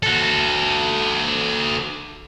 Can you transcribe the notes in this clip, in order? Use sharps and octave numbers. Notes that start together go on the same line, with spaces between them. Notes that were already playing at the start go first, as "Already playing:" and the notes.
F#4 A4